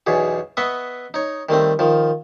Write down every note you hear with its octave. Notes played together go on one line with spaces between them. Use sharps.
B1 E2 B2 G#4
B3 B4 D#5 E5 C#6
D#4 C#5
D#3 G3 A3 C4
D#3 F3